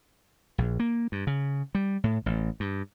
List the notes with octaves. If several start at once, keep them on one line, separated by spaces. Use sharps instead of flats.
A#1
A#3
G2
C#3
G3
A2
A1
G2